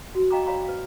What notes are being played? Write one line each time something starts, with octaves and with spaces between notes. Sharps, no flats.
F#4
D#5 F5 G5 A#5 C#6 D6
C#5 D5 F5 A#5 B5 C#6
B4 F5